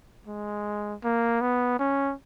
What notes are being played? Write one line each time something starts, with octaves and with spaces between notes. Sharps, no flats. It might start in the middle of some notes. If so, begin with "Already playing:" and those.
G#3
A#3
B3
C#4